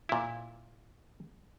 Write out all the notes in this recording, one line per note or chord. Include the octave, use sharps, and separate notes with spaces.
A#2 E4